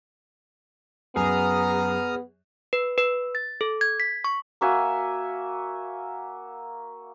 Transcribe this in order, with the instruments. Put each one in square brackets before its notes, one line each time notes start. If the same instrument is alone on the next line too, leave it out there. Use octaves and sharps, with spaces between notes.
[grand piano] F#2 [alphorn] B3 [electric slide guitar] G#4 [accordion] A#5 D#6 F6
[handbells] B4
B4
A6
A4
G#6
B6
C#6
[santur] A#3 F#4 E5 G#5